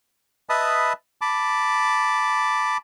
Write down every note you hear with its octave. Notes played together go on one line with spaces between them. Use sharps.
B4 D#5 E5 A5 B5 D#6
A5 B5 D6